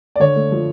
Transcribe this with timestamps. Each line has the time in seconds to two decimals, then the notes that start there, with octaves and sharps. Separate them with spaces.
0.16 D5
0.20 D3 C#5
0.36 A3
0.52 F3